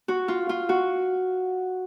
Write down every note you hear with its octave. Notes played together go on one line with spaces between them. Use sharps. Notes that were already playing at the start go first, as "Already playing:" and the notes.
F#4
F4
F4
F#4